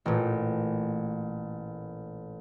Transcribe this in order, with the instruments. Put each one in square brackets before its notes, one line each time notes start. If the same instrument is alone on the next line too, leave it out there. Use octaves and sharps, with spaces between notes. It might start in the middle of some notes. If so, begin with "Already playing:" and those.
[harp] A1 A#2